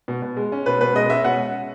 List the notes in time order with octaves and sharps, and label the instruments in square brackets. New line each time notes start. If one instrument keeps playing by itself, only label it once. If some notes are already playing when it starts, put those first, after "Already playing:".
[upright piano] B2
B2
G#3
C#4
B2 B4
B2 B4
G#3 D#5
C#4 E5
B2 F#5